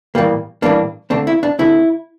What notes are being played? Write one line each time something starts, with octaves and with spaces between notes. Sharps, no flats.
A2 E3 G3 A#3
A2 E3 G3 A#3 D4
D3 A3 C4 D4
E4
D4
D3 A3 C4 E4